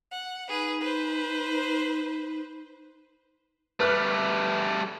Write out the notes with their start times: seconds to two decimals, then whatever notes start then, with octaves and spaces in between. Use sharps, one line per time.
0.11 F#5
0.49 D#4 G#4 B4
0.81 B4 C5
3.80 G3 A3 B4 F6 F#6